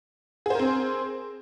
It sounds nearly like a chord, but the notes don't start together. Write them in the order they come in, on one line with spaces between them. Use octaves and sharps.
G#4 C5 A#4 C4